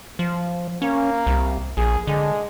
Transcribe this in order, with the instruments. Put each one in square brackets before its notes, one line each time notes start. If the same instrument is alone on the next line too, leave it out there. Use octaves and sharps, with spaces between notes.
[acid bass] F3
[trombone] A#3 [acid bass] C#4
[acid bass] C2
[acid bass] A#1 [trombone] G#4
[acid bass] D3 [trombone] G#3